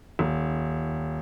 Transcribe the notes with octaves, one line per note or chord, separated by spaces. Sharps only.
D#1